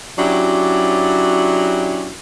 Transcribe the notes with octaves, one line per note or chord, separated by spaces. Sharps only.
F#3 C#4 D4 E4 F#4 G4